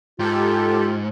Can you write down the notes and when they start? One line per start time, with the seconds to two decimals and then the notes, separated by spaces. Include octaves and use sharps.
0.19 G#2 F4 G4 A4